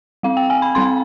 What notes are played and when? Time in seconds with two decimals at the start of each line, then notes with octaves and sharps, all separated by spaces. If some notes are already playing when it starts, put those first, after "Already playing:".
0.23 G3 C4 F5
0.37 G5
0.50 G#5
0.62 B5
0.75 G3 C4 C6